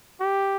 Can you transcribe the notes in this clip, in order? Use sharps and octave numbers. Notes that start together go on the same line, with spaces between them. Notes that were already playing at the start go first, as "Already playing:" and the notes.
G4